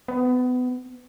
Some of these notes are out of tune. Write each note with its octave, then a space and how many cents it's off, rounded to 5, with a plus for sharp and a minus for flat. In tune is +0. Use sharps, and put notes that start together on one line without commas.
B3 +25